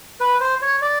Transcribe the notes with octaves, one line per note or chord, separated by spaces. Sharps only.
B4
C5
C#5
D5